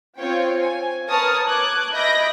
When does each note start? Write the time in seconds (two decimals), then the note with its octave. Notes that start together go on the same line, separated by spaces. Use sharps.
0.17 C4 F4 C#5 G5
0.60 G#5
1.09 A#4 B4 C#5 A5 D#6 F6
1.48 D6 F#6 G#6
1.93 D#5 E5 B5 G6 A#6 D7